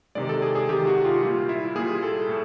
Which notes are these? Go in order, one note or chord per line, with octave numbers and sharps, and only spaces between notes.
C3 D#3 G#3 D5
A4
G#4
G#4
C3 D#3 G#3 G4
F#4
F4
A#2 G3 F4
E4
A#2 G3 G#4
A4
A2